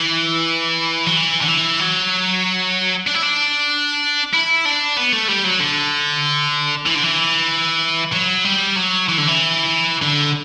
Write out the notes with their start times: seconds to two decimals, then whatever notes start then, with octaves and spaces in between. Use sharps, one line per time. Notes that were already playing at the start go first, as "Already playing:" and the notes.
Already playing: E3
1.06 F#3
1.17 E3
1.41 D3
1.48 E3
1.80 F#3
3.07 D4
3.14 E4
3.22 D4
4.33 E4
4.65 D4
4.97 B3
5.13 A3
5.28 G3
5.44 F#3
5.60 D3
6.86 E3
6.95 D3
7.04 E3
8.13 F#3
8.44 G3
8.76 F#3
9.08 E3
9.17 D3
9.27 E3
10.02 D3